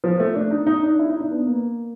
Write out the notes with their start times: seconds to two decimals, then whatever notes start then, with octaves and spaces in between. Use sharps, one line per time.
0.04 F3
0.20 A3
0.36 D4
0.51 D#4
0.66 D#4
0.83 D4
0.99 E4
1.09 D#4
1.20 D4
1.31 B3
1.46 A#3